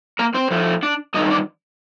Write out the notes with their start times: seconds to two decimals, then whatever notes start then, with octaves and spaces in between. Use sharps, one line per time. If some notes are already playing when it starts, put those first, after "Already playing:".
0.19 A#3 A#4
0.34 C4 C5
0.51 A2 F3 A3
0.83 D4 D5
1.14 G2 D#3 A3 D#4 D#5
1.31 D4 D5